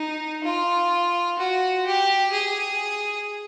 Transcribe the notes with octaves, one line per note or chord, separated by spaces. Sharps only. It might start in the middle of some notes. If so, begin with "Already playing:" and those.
Already playing: D#4
F4
F#4
G4
G#4